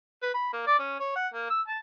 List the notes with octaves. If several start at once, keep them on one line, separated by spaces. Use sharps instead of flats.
B4
B5
A#3
D5
C#4
C#5
F#5
A#3
E6
A5